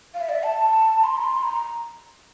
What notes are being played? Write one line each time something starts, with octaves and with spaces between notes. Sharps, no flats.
F5
E5
D5
E5
A5
C6
A#5
C6
A#5